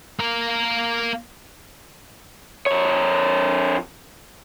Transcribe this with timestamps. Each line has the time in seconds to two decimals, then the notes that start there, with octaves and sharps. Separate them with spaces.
0.20 A#3 A#4
2.66 F2 C#5